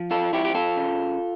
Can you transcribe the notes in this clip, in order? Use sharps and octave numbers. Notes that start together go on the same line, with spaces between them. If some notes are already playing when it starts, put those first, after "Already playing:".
Already playing: F3
F4 A4
F3 E4 G4
G4
F4 A4
C#3